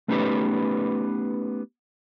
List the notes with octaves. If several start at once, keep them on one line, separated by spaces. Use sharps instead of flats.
A3 B3 C#4 D#4 G4 B4